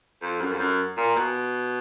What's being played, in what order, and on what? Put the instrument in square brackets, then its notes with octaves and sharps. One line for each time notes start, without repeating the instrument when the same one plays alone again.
[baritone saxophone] F2
F#2
F2
F#2
A#2
B2